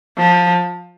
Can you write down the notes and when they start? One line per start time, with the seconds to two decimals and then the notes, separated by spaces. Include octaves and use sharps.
0.18 F3